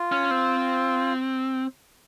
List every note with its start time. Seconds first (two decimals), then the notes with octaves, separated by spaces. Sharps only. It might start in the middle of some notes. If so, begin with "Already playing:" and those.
Already playing: F4
0.12 C#4
0.31 C4